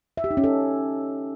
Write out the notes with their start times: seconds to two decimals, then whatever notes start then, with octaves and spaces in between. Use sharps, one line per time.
0.17 E5
0.24 G4
0.31 D#4
0.37 C#4
0.44 A4